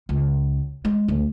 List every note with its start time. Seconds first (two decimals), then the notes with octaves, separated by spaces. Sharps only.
0.09 C#2
0.85 G#3
1.08 D2